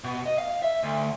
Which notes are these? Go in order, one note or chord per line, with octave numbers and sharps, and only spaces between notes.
B2
D#5
F5
E5
D2